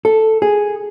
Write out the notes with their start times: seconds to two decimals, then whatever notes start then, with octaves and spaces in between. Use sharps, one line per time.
0.05 A4
0.42 G#4